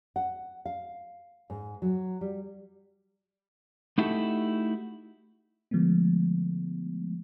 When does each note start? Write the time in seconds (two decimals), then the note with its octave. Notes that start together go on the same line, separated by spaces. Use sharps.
0.16 F#5
0.65 F5
1.50 G#2
1.82 F#3
2.21 G3
3.98 A3 D#4 E4 F#4 G4 A4
5.71 D3 F3 G#3 A3 B3